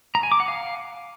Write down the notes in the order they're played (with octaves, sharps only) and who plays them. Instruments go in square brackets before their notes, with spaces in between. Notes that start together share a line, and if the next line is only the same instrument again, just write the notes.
[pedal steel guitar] A#5
G#5
D6
F#5
F5